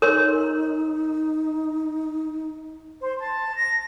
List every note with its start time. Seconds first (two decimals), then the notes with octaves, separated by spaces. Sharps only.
0.02 D#4 A#4 C#5 C6
3.01 C5
3.20 A5
3.56 A#6